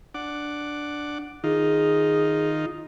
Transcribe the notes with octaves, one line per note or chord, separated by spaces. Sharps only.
D4 F#5 D6
D#3 D#4 F4 G#4